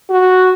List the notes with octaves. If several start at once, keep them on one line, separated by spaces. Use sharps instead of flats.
F#4